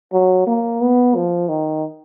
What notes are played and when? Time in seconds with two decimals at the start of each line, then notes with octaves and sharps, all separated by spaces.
0.13 F#3
0.46 A#3
0.81 B3
1.15 F3
1.48 D#3